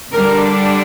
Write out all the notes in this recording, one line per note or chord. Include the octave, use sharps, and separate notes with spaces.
D3 G3 D4 A#4